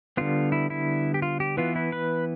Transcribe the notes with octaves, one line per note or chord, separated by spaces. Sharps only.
D3 G3 B3 F4
E4
E4
G4
F4
G4
E3 B3 F4
E4
B4